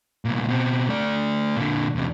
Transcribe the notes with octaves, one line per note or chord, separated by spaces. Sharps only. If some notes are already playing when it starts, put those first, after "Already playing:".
C2 A#2
B2 C4
A3 D5
A#2 D3
E2 C3